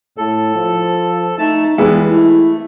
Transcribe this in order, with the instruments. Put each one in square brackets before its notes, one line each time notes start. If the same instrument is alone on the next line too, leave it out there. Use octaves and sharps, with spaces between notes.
[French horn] A2 [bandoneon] A4
[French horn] F3
[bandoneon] A3 A5 [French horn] D#4
[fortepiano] E3 G#3 B3 [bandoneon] G3 [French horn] E4
[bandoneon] A3 [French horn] E4